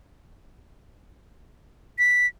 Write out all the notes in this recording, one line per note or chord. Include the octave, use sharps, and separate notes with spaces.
B6